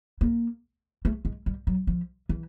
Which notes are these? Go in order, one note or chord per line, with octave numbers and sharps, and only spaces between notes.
A#3
A3
G#3
G3
F#3
F3
E3